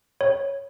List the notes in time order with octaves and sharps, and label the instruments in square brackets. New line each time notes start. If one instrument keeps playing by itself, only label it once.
[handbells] C#5